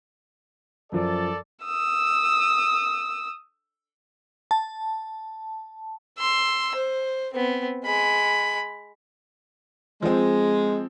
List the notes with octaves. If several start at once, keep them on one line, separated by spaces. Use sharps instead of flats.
F#2 F3 A4 D5
D#6 E6
A5
C6 E6
C5
B3 C4
G#3 B5
F3 G#3 C4